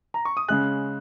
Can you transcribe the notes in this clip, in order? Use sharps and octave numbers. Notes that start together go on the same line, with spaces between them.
A#5
C#6
D#6
C#3 G#3 C#4 G#4 F#6